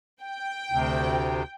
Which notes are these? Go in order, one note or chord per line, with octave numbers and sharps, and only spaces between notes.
G5
D2 C3